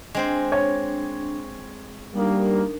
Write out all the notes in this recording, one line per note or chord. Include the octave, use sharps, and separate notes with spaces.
G#3 C4 D4 C5
C#5
G3 A#3 D4 D#4 A#4